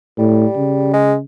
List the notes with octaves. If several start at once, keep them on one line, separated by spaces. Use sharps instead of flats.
A2 G3
C#3
G#3